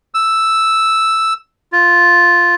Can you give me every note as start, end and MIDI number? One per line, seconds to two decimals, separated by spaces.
0.14 1.33 88
1.72 2.55 65